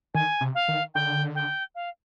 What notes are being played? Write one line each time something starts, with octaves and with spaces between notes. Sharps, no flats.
D#3 G#5
C3
F5
D#3
D3 G5
G5
F5